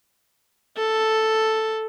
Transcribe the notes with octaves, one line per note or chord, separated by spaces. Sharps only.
A4